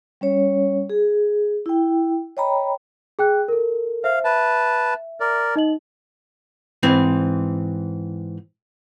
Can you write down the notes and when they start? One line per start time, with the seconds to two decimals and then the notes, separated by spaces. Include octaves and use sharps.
0.21 G3 C#4 C#5
0.90 G#4
1.66 E4 G5
2.37 C#5 D#5 G5 A#5 B5
3.19 G#4 G5 F#6
3.48 A4 A#4
4.04 C5 E5 F5
4.24 B4 E5 A5
5.20 A#4 D5
5.56 D#4 D#5 F#7
6.83 G#2 E3 C4